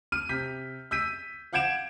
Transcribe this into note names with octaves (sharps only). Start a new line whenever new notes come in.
F6 D#7
C3 G6 B6
E6 G6 B6 D#7
F5 F#5 G6 G#6 D7 E7